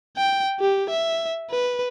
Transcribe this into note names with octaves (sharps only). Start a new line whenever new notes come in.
G5
G4
E5
B4